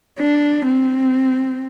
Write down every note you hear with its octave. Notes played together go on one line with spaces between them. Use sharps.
D4
C4